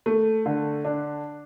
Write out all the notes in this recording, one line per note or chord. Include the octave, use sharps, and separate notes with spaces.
A3
D3
D4